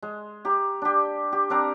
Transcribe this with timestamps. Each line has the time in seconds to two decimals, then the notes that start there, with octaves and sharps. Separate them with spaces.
0.02 G#3
0.45 G4 A#5
0.82 D4 G4
1.32 G4
1.50 C4 D4 A#4